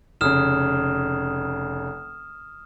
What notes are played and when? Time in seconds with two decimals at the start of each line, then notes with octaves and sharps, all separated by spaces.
0.21 F1 C#3 D#6 F6 E7